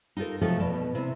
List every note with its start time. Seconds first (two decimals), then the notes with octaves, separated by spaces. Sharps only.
0.17 D#4 F4 G4 A4 A#4
0.41 C3 F3 F#3 A3 D#4 A4
0.60 E2 B2 A5
0.73 B2
0.95 C3 E4